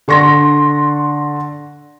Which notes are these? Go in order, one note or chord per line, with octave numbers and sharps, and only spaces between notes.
D3 C6 C#6 A#6